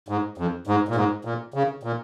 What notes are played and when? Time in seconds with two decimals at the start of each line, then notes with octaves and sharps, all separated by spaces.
0.09 G#2
0.38 F2
0.67 G#2
0.89 A#2
0.96 G#2
1.25 A#2
1.54 C#3
1.83 A#2